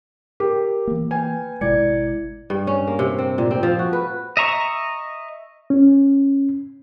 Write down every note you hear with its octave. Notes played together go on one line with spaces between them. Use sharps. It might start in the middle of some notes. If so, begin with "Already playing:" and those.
G4 A#4
E3 A#3
B4 G5 G#5
G#1 B2 G#3 E4 D5 G#6 C#7
G2
C#4
A#3
C3
C4
A#2
C4
F3
F#4
B4
D#5 E5 A#5 C#6
C#4